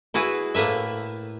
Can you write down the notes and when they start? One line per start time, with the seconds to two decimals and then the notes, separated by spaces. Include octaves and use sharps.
0.14 E4 F#4 G#4 B4
0.55 A2 A#3 B4 E5